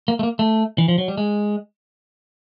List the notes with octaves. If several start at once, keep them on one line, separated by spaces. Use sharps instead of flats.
A#3
A3
A#3
A3
E3
F3
F#3
G3
G#3